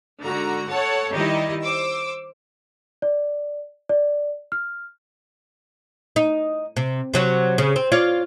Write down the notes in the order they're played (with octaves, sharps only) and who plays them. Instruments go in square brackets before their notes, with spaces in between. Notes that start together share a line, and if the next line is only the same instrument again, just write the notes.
[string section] G#2 D3 F#4 A#5
A4 C#5 F#5 A5
D#3 G3 D#4 E4 G4 D#5
C5 D6 E6
[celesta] D5
D5
F6
[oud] D#4
C3
C3 F#3 F#4
C#3
C4
F4 C#5 D5